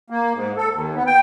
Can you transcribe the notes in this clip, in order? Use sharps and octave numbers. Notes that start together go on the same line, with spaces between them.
A#3
G#2
A4
D#2
B3
G5